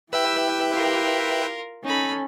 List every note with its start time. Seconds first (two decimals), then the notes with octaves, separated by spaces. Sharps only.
0.13 E4 G4 B4 E5 G5 E6
0.72 F4 A#4
1.84 C#4 D#4 A4 B5